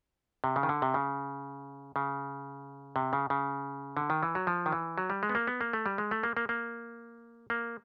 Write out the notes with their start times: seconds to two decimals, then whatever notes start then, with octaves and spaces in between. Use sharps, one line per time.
0.44 C3
0.56 C#3
0.63 D#3
0.69 D3
0.82 C3
0.94 C#3
1.96 C#3
2.96 C3
3.13 C#3
3.30 C#3
3.97 D3
4.10 D#3
4.23 E3
4.35 F#3
4.47 F3
4.66 D#3
4.72 E3
4.98 F#3
5.10 G3
5.23 G#3
5.29 B3
5.35 A#3
5.47 B3
5.61 A#3
5.73 A3
5.86 G3
5.98 G#3
6.11 A3
6.23 A#3
6.37 A#3
6.49 A#3
7.50 A#3